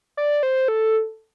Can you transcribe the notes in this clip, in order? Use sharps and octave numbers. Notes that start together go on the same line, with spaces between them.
D5
C5
A4